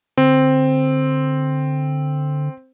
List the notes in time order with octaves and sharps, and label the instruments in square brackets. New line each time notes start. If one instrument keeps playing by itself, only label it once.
[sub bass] D3 [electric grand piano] C4